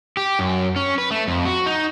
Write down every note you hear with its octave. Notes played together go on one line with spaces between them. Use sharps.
G4
F#2
C#4
B4
A3
F2
F#4
D#4